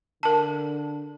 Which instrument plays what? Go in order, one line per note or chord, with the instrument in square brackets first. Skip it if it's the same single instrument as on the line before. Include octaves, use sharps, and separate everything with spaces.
[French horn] D3 [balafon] A#4 A5